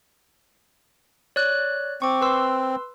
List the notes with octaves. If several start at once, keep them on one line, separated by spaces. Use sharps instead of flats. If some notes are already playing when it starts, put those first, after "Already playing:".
C#5 D5 F#6
C4 C#6 D6
B4 C6 E6